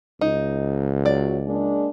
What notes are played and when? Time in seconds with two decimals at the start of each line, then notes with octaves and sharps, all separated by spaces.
0.21 C#2 D#4
1.05 F#3 D5
1.47 G#3 A#3 D4